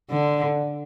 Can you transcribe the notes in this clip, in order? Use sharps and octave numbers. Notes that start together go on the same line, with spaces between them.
D3